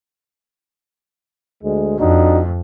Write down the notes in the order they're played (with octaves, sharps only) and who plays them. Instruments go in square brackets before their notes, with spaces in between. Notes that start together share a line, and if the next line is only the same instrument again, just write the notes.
[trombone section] D2 G#3
[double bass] F2 [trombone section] D4 D#4 F#4